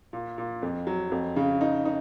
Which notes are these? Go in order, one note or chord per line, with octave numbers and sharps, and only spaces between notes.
A#2
A#2
F2
F#3
F2
C#3
D#4
D#4